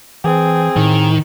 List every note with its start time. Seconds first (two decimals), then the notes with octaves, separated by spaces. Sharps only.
0.24 E3 C4 G#4
0.76 A2 D#3